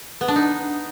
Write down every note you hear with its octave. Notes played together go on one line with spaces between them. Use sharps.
B3
D4
D#4